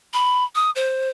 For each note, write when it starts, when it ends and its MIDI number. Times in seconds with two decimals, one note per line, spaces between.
0.13 0.44 83
0.55 0.70 87
0.75 1.09 72